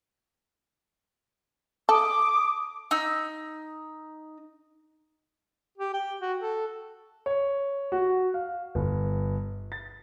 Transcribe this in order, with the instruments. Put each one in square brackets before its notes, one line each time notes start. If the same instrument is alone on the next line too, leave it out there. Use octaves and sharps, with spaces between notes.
[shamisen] A4 [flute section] D6 D#6
[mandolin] D#4 E6
[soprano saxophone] G4
G5
F#4
A4
[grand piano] C#5
F#4
F5
G1
A6